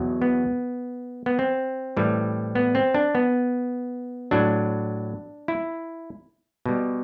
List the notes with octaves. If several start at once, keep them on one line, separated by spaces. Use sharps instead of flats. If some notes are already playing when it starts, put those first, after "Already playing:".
Already playing: E2 B2 F#3
B3
B3
C4
A2 E3 G3
B3
C4
D4
B3
A2 F#3 D4
E4
B2 G3